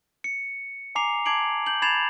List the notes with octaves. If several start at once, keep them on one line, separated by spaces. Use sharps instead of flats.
C#7
G#5 A#5 D6 C7 F7
A5 D6 G#6 C7 D7 F#7
G6 F#7
B5 G#6 A6 C7 E7 F7